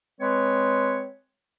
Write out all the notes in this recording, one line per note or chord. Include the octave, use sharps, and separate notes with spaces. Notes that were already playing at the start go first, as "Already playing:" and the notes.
G#3 C4 B4 C#5